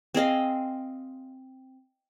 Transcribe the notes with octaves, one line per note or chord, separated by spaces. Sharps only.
C4 G#4 D#5 F5